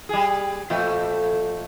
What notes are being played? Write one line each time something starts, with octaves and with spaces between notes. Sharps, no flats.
G3 G#4
F2 A#2 A3